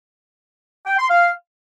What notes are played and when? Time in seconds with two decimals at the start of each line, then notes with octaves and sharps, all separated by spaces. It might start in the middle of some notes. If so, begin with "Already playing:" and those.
0.87 G5
0.98 C6
1.10 F5